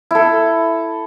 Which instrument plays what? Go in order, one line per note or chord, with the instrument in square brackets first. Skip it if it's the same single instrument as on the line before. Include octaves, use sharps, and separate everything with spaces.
[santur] E4 A4